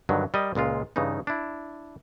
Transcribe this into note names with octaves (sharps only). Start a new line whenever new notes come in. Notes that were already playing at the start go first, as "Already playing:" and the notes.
G2 D3 D#3 F#3
G3 A#4 D#5
C#2 A#2 G#3 F4
G2 C#3 E3 D#4
D4 E4